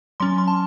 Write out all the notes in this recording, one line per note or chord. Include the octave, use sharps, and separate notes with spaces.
F#3 C#4 C6
C6
A5